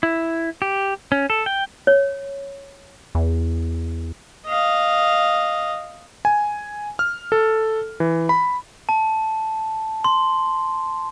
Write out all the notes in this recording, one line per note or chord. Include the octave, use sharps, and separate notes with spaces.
E4
G4
C#4
A4
G5
C#5
E2
D#5 F5
G#5
F6
A4
E3
B5
A5
C6